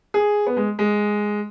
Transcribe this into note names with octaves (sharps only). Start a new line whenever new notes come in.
G#4
B3
G#3
G#3